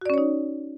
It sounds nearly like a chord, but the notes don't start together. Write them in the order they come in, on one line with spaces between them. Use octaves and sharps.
F#4 D5 C#4 C#5 D#4